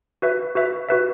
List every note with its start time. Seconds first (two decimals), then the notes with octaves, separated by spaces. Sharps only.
0.22 F#4 B4 E5
0.55 F#4 B4 E5
0.89 F#4 B4 E5